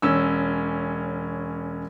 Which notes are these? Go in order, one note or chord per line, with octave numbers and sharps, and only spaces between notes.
E1 C#4 E6